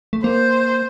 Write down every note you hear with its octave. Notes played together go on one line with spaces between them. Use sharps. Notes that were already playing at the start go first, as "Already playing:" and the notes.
A3
A#3 C5